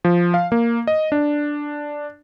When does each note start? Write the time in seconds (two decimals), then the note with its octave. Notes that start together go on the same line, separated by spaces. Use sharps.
0.05 F3
0.34 F5
0.52 A#3
0.87 D#5
1.12 D4